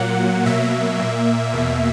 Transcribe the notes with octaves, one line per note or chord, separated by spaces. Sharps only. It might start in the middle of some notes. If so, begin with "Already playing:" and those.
Already playing: A#2 F#3 A#3 F#5
B2 F#3 A#3 E5
A#2 A#3
E2 B2 A#3